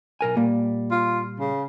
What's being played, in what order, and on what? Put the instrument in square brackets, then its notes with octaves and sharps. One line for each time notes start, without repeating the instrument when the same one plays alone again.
[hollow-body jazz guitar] B1 A#4 G#5
A#2 G3 A#3
[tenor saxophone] F4
C#3